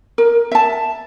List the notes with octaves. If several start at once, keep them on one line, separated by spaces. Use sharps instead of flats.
A#4
E5 A5